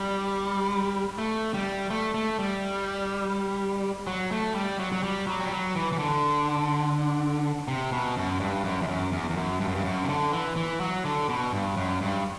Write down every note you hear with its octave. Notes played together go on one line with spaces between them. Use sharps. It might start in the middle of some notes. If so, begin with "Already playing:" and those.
Already playing: G3
A3
G3
A3
A3
G3
F#3
A3
G3
F#3
F#3
G3
F#3
G3
F#3
E3
E3
D3
C3
B2
F#2
G2
F#2
E2
F#2
E2
E2
F#2
G2
F#2
G2
F#2
C3
D3
E3
E3
F#3
D3
B2
G2
F#2
G2